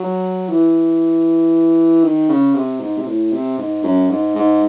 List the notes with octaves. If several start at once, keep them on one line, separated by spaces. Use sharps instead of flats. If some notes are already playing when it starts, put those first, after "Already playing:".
Already playing: F#3
E3
D#3
C#3
C3
G#2
C3
A2
C3
G#2
F#2
G#2
G#2